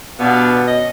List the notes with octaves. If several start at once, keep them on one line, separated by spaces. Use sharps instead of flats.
B2 G3 B3 D4 F5
C#4 D#5